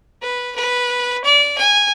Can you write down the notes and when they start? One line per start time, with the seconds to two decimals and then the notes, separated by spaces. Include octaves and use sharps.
0.22 B4
0.56 B4
1.24 D5
1.58 G#5